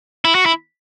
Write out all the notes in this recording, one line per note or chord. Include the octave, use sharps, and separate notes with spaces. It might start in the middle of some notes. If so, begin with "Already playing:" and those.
E4
F#4
E4